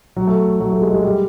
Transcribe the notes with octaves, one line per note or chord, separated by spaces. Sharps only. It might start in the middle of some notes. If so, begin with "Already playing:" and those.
F#3
A3
F#3
A3
G#3
G#3
G3